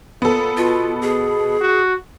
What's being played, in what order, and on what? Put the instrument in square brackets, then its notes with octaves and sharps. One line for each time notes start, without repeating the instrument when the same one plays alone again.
[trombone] A#2 [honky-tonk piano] B3 A4
[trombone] B2 [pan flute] F4
[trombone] B2 [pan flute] G#4
[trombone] F#4